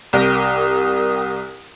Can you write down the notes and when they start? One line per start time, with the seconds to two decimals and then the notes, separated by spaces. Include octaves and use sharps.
0.13 C2 G4 A#4 D#6